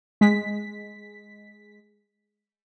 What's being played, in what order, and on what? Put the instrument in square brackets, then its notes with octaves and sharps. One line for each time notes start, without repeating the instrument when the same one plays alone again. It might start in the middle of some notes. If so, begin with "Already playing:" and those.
[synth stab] G#3 B6